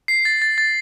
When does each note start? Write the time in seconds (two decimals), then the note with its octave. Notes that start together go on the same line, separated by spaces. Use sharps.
0.08 C7
0.25 A6
0.42 A6
0.58 A6